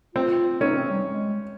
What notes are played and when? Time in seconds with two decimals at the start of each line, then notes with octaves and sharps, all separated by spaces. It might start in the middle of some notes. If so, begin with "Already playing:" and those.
0.15 C4 F4
0.60 C#4 D#4
0.75 C4
0.90 G3
1.06 G#3